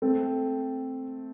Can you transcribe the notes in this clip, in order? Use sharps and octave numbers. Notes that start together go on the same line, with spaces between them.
A3 C4